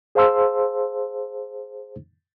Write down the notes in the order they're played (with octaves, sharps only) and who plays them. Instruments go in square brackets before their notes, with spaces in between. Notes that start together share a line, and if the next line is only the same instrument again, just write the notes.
[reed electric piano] G#4 C5 F5 A5 C6 E6